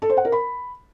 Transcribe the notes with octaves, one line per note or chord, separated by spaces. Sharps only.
A4
C5
F#5
A#4
B5